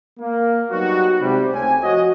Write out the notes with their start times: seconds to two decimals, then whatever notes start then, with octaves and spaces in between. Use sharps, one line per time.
0.20 A#3
0.71 F#3 G3 B3 D#4 F#4
1.20 G#2 C3 G3
1.53 C#2 A3 C4 C#5 G#5
1.83 F3 F#4 D#5